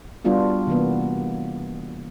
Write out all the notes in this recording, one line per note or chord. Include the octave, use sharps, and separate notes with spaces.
G3 B3 D4 F4 F#4
C3 E3 A#3 B3